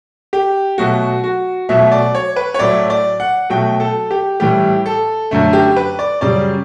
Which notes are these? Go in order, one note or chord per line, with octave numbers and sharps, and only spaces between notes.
G4
B2 F#3 A3 F#4
F#4
B2 F#3 A3 E5
D5
C#5
B4
C#5
A2 F#3 A3 D5
D5
F#5
B2 F#3 A3 G5
A4
G4
A2 E3 G3 G4
A4
F#2 D3 A3
G4
B4
D5
F#2 C#3 G3 D5